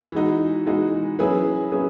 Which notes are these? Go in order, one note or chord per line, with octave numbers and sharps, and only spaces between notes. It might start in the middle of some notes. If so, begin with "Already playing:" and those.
E3 G#3 D#4 F#4
E3 G#3 D#4 F#4
F#3 C#4 E4 G#4 B4
F#3 C#4 E4 G#4 B4